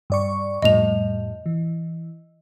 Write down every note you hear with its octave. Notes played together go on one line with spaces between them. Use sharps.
G2 D5 C#6
F2 A2 G3 D#5 F7
E3